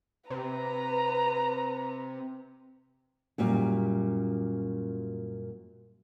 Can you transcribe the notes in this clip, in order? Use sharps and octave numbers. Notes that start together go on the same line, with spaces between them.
C3 B4 A#5
F#2 A#2 G3